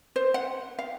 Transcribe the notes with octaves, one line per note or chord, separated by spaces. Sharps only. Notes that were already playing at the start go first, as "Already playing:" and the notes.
C5
F#5
F5